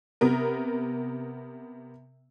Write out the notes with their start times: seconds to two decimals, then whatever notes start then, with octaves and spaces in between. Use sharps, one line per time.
0.21 C3 B3 A#4